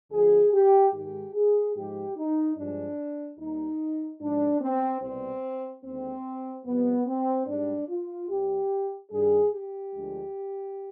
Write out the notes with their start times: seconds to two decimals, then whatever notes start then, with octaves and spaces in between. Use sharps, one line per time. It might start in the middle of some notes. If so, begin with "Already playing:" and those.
0.11 D2 D3 F3 G#4
0.53 G4
0.93 G#2 D#3 G#3 G4
1.34 G#4
1.76 G#2 F3 G#3 G4
2.16 D#4
2.56 G2 F3 G#3 D4
3.38 D#2 D#3 G3 D#4
4.21 G#2 F3 G#3 D4
4.61 C4
5.02 C2 B2 G3 C4
5.84 D#2 D3 G#3 C4
6.66 F2 C3 G3 B3
7.07 C4
7.47 G#2 G3 D4
7.89 F4
8.29 C2 C3 G3 G4
9.11 G2 D#3 G3 G#4
9.52 G4
9.92 D2 D3 F3 G#3